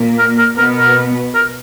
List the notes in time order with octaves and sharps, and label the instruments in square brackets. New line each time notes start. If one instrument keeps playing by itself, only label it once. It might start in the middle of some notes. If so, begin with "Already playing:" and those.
Already playing: [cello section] A#2 A#3
[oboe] A#4
A#4
[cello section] B2 B3 [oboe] A#4
[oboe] A#4
A#4